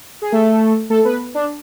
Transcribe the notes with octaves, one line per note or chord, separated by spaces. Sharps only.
G#4
A3 A4
A3 A4
B3 B4
D4 D5